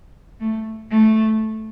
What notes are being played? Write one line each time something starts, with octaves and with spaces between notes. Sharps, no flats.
A3
A3